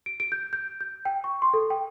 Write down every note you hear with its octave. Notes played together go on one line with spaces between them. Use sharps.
D7
D7
G6
G6
G6
G5
C#6
C6
A4
G5